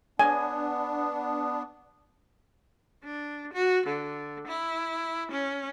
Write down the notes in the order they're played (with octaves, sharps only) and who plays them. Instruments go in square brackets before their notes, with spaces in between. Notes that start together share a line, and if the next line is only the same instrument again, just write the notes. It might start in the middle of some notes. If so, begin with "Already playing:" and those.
[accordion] B3 D4 [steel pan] G#5
[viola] D4
F#4
D3
E4
C#4